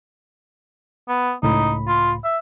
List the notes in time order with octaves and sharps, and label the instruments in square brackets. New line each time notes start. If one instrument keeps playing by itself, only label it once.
[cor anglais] B3
[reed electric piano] C#2 A2 B5 [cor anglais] D#4
[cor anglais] F4
E5